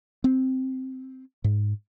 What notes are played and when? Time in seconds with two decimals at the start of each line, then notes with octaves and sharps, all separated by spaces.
0.24 C4
1.44 G#2